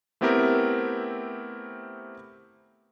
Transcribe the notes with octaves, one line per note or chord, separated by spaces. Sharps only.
A3 B3 C4 E4 G4 A#4